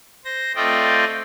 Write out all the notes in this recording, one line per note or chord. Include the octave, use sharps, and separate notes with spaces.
C5 A#6
A3 C4 F4 D5 D#5 G5